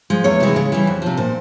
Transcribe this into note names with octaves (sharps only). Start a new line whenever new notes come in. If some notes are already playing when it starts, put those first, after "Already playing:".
F3 G#3
E2 C#5
C3 E3 G#3
C#3
E3 G3
F2
C3 F3
A#2 C5